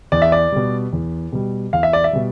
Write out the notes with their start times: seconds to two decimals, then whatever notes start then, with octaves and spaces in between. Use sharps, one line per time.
0.12 E2 D5
0.22 E5
0.32 D5
0.52 B2 G3
0.93 E2
1.33 B2 G3
1.73 E2 F5
1.83 E5
1.93 D5
2.04 E5
2.13 B2 G3